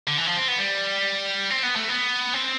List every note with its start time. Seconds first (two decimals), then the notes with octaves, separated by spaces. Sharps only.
0.07 D3
0.18 E3
0.27 F3
0.37 C4
0.48 B3
0.58 G3
1.50 C4
1.63 B3
1.76 A3
1.88 B3
2.34 C4